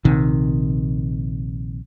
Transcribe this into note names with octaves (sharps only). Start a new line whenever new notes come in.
A#1 C3 D#3